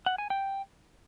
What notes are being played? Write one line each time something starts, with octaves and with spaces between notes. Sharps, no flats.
F#5
G#5
G5